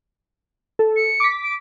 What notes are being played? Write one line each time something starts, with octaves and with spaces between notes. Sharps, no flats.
A4
C#7
D6 B6
D7